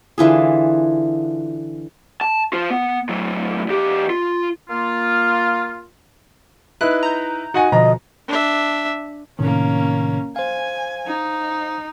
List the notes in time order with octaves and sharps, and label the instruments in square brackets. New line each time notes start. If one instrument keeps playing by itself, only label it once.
[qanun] D3 E3 F4 G#4
[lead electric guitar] A5
F4 C5
B3
A2 F#3
E2 G4
F4
[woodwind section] A#3 F4
[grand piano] D#4 E4 B4 [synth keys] F#6
[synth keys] A#5 G6
[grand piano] D#4 F#5 G#5 [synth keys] F#4
[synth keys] B2 D3 F3 [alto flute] D#5 [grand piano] A#5
[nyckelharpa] D4 E5
[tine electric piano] A2 C3 D#3 [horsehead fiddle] A#3 C#4
[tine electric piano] C5 F5 [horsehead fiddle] G#5
[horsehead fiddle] D#4